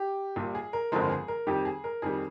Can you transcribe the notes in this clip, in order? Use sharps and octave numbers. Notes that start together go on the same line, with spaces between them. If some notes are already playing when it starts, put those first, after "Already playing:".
Already playing: G4
A#1 A#2 G3
G#4
A#4
G1 F2 D3 F3 G#3 A#4
G#4
A#4
F2 D#3 G3 G4
G#4
A#4
F2 D#3 G3 G#4